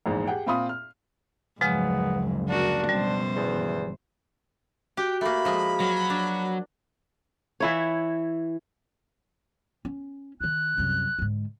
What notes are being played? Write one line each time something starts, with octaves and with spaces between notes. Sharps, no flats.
A#1 E2 G#2
G4 G#4 F#5 G5
A#2 C4 F4 B5 C6 D#6
F6
F#1 D2 G#2 C#3 F3 G#3 B3
D4 F#4 A#4
F#2 B2 G3 C5
G1 E2 G2 E3
F#4 G4 G5
A3 A#3 B5
F3 G#3
F#3 A#4
D4
E3 E4 C#5
C#4
D#3 E4 F#6
C2 F#2
G#2 D3